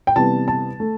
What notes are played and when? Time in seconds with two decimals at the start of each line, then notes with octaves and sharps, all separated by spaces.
0.07 G5
0.16 C3 E3 G3 B3 A5
0.48 A5
0.80 A3